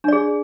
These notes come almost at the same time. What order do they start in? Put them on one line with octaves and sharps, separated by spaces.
D4 D5 G#4